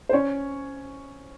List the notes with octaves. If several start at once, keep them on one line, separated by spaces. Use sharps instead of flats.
C5
C#4 C#5